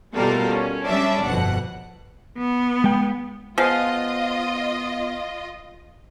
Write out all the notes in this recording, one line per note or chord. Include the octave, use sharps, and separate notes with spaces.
B2 G3 A3 F4 A4 A#4
C#4
G3 C#4 D4 E5
G1 F2 B2 F#5
B3
G#3 G5
F3 G#3 B3 F4 D#5 F5